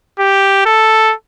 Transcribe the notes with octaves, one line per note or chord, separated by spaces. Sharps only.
G4
A4